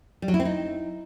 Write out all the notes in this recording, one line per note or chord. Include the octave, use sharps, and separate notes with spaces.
G3
F#3
E4
C4
D#4